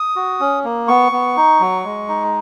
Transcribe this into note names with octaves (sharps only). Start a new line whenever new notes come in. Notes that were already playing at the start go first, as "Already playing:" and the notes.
Already playing: D#6
F#4
C#4
A#3
B3 C#6
B3
D#4
F#3
G#3
D#4